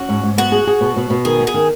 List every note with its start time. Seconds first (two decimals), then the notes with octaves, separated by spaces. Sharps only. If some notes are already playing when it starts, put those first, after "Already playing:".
Already playing: C#4 F#4
0.09 G#2
0.23 G#2
0.38 B3 F#4
0.52 G#4
0.67 G#4
0.81 B2
0.96 B2
1.10 B2
1.25 D#3 G#4
1.40 B3
1.47 G#4
1.54 D#3